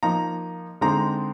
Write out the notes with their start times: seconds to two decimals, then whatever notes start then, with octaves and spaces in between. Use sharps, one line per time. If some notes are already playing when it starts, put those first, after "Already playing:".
0.03 F3 A#3 D#4 A#5
0.81 D3 G#3 C4 D#4 A#5